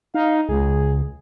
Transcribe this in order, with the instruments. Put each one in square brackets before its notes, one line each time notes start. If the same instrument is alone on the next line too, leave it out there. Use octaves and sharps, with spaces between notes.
[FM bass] D#4 [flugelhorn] F5
[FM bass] C#2 [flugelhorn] G#4